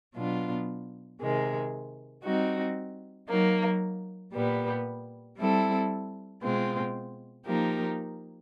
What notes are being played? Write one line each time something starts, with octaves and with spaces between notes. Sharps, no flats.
B2 F#3 B3 D4 F4
C3 D#3 G#3
G3 C4 D#4 F#4
F#3 A#3 D#4
A#2 G3 B3
G3 C4 E4 A4
B2 G#3 C4 F4
F3 A#3 D#4 G4 A#4